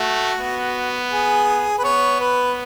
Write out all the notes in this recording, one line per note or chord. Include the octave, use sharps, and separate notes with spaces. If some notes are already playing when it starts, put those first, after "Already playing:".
Already playing: A3 F#4
B3
G#4
B4
B3 C#5
B4